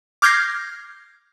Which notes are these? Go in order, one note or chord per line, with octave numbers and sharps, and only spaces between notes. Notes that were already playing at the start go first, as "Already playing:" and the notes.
D6 F6 G6 G#6 A#6 C7